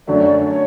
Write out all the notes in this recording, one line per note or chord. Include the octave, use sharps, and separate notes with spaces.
F#2 D3 F#3 A3 D5
C#5